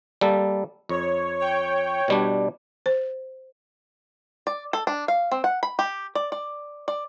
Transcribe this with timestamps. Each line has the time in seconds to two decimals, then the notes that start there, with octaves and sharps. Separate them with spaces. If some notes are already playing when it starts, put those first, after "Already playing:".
0.21 G3 A#3 A4
0.89 F2 C#5
1.39 C#5 G5
2.08 B2 G3 D4
2.86 C5
4.47 D5
4.73 A4
4.87 D4
5.08 F5
5.32 C4
5.44 F#5
5.63 B5
5.79 G4
6.15 D5
6.32 D5
6.88 D5